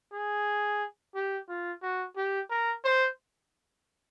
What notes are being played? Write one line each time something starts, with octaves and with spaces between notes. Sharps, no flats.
G#4
G4
F4
F#4
G4
A#4
C5